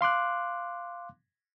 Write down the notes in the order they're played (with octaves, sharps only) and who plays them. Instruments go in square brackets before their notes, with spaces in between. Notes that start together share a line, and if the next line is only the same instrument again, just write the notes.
[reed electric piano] F5 C6 D6 F#6